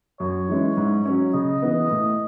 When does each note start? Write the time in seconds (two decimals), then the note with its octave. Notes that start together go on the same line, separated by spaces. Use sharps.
0.20 F#2 C#5
0.49 E3 G#3 C#4 E4
0.77 G#2
1.05 F#3 C#4
1.34 C#3 D#5
1.62 E3 B3
1.91 A2